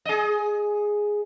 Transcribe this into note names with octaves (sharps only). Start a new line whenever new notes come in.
G#4 D#5